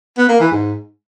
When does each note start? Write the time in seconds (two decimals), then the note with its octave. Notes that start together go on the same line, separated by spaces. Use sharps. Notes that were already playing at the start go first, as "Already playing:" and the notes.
0.18 B3
0.29 A#3
0.40 E3
0.51 G#2